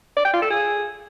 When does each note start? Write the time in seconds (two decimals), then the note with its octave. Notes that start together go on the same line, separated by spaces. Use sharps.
0.17 D5
0.25 G5
0.33 F4
0.42 A4
0.50 G#4